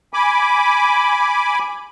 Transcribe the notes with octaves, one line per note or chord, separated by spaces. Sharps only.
G#5 B5 D6